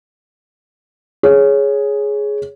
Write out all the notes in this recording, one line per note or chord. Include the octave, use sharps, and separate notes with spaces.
G#4 C#5